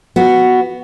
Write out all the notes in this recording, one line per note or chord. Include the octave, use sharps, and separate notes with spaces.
B3 F#4